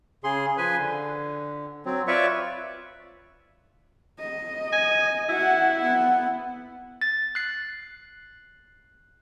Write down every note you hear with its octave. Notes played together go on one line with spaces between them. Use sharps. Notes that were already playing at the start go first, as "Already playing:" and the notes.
C#3 G#4 C6
F3 B4 G#5
D3
F#3 C4
F4 B4 C#5 D5 E5 C#6
D#5
G#5
E4 F#4 F#5
B3 F#5
A6
F#6 C7